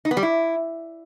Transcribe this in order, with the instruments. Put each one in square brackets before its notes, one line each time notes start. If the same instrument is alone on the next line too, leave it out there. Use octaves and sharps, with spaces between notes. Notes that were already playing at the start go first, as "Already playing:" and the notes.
[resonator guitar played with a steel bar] D#4
B3
G3
E4